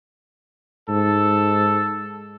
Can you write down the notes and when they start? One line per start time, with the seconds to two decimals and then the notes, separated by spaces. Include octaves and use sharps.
0.89 G#2 A4